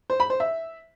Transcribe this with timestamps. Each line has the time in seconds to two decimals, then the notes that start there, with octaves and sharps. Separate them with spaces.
0.10 C5
0.20 B5
0.30 C5
0.40 E5